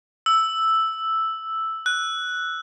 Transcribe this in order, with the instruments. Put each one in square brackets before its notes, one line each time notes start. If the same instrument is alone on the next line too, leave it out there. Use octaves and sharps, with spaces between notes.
[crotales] E6
F#6